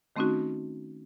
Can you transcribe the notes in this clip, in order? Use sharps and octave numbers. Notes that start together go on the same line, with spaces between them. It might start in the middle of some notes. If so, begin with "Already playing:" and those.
D#3 A3 C4 C#4 D#4 F#4